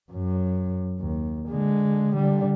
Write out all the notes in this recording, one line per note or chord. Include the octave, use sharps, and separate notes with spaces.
F#2
D#2
D3 G#3
D3 G3